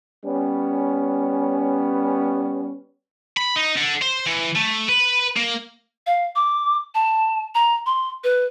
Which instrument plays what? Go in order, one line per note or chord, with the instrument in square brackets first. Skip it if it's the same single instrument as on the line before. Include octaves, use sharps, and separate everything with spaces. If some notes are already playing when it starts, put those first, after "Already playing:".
[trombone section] G3 B3 C#4
[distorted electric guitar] B5
D#4
D3
C5
E3
A3
B4
A#3
[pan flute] F5
D6
A5
A#5
C6
B4